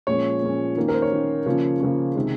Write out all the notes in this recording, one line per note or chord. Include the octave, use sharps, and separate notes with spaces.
A#2 F3 G#3 C#4 C#5
A#2 F3 G#3 C#4
D#3 A#3 C#4
A#4
C5
C#5
D#3 A#3 C#4
C#3 F3 A#3 C#4
C#3 F3 A#3 C#4
C3 D#3 G#3